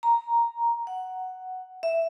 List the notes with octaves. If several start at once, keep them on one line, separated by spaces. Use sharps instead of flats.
A#5
F#5
E5